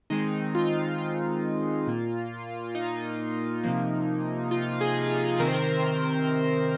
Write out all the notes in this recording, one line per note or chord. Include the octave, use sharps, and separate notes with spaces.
D#3 G#3 C4 D#4
F4
F4
A#2 A#3
D#4
C3 F3 A#3
F4
G#4
F4
C3 D#3 C4 A#4
C5
A#4